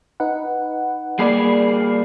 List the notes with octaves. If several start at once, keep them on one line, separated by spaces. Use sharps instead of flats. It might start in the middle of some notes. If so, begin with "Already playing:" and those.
D#4 B4 F#5
G3 A#3 G#4 D5 B5 C7